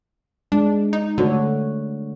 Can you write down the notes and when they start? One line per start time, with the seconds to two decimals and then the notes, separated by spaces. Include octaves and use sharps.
0.52 G#3 D4
0.93 D#4
1.18 D3 A3 F#4 C#5